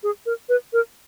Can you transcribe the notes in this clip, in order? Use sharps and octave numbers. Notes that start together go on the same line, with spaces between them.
G#4
A#4
B4
A#4